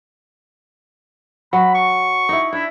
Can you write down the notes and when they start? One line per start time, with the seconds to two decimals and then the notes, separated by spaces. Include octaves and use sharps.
1.53 F#3 F#4 B5
1.75 C#6
2.29 D#4 E4
2.53 D4 E4